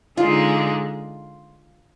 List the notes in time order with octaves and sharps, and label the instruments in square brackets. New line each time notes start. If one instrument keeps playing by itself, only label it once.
[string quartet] D3 G#3 D#4 [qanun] F4